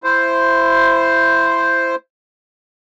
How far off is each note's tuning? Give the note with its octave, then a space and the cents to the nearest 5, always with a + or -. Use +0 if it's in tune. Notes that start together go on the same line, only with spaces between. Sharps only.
E4 +20 C5 +0